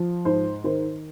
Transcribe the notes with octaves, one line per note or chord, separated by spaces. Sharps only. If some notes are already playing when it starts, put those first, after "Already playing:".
Already playing: F3
G#2 C5
D#3 C5